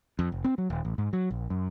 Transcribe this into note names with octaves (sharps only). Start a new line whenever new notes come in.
F2
F1
C4
F#3
D#1
A1
G#2
F#3
A#1
F#2